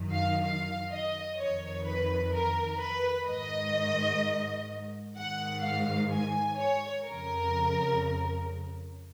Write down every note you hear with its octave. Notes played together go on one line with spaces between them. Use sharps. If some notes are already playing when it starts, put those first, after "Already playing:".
Already playing: F#2 D#3
F5
F5
D#5
F2 D#3 C#5
B4
A#4
B4
G#2 D#3 D#5
G#2 D#3 F#5
F5
G#5
C#5
F2 C#3 A#4